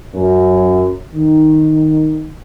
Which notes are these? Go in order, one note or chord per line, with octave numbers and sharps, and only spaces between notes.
F#2
D#3